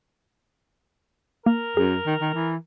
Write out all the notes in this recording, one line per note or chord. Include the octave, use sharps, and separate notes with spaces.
A#3 A#4
F#2 G#4
D#3
D#3
E3